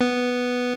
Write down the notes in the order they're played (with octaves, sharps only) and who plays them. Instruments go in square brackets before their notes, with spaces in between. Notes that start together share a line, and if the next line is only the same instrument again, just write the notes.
[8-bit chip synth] B3